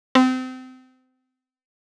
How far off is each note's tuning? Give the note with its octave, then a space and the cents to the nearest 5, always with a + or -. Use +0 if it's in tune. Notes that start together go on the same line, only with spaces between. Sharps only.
C4 -30